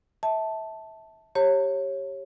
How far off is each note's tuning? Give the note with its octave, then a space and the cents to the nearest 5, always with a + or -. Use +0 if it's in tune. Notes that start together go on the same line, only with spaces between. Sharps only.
E5 -25 A5 +0
G4 +0 C#5 -20 A#5 -45